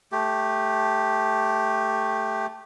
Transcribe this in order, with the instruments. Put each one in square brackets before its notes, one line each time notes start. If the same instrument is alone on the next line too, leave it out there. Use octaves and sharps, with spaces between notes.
[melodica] A3 G4